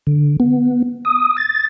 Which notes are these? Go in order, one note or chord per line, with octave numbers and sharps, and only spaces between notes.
D3
B3
D#6
A6